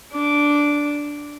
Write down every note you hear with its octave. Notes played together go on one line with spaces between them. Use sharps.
D4 D6